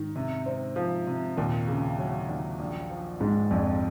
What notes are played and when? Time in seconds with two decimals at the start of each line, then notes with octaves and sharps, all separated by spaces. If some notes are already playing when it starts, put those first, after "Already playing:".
Already playing: G#2 D#3
0.16 C3
0.46 C4
0.76 F3
1.07 C3
1.37 D#2 A#2
1.68 C#3
1.99 F#3
2.29 D#2
2.59 A#1
2.90 F3
3.20 G#2 G#3
3.51 A#1 F2